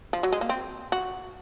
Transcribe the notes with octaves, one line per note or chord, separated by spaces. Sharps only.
F3
F#3
G#3
A#3
C4
F#4